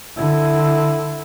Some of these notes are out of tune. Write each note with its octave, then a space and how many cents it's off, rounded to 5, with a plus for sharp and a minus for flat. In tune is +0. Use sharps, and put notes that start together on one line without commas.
D3 +10 E4 +0